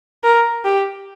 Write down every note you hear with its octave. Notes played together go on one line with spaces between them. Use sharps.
A#4
G4